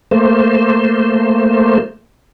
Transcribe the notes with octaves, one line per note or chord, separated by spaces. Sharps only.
A3 A#3 C5